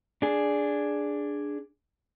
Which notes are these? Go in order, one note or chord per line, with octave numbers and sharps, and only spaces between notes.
D4 G#4